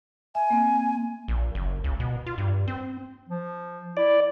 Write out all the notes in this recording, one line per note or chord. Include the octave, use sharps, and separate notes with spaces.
E5 G#5
A#3 C4
A#1
F#1
C#2
B2
F4
G2
C4
F3
E4 D5